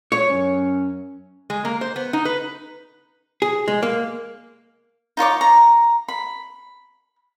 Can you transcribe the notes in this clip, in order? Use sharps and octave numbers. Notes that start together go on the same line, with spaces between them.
C#5
F#2 F#3 C#4
G#3
A#3
C5
B3
D#4
B4
G#4
G#3
A#3
D#4 F4 C#5 D6
A#5
B5